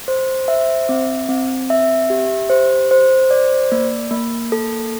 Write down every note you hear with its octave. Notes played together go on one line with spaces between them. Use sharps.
C5
E5
C4
C4
E5
G4
C5
C5
D5
A#3
A#3
A4